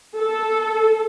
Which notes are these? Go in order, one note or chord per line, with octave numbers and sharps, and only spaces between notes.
A4